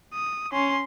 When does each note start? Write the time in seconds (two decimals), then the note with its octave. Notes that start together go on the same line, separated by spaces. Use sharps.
0.14 D#6
0.53 C#4 C6